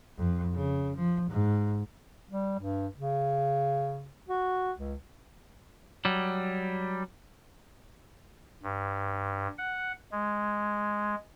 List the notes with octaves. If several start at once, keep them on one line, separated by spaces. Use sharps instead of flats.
F2
C#3
F3
G#2
G3
G2
C#3
F#4
C#2
F#3 G3
G2
F#5
G#3